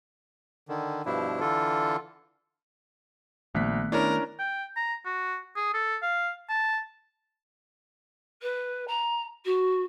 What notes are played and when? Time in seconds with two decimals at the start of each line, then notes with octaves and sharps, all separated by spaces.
0.68 D3 D#3
1.06 G2 B2 F3 D4 E4
1.40 D3 E3 F4 A4
3.55 A#1 D#3 A3 B3 F#6 B6
3.92 C#4 D4 E4 A#4
4.39 G5
4.76 A#5
5.05 F#4
5.56 G#4
5.74 A4
6.02 F5
6.49 A5
8.42 B4
8.87 A#5
9.45 F#4